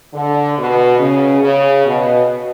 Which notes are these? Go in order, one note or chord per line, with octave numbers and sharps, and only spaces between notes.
D3
B2
C#3
C#3
B2